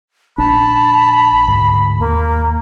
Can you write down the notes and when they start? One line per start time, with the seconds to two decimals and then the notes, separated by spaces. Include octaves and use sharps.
0.38 A#1 D4 A5 B5
1.48 D2 G#2
1.99 D#2 A#3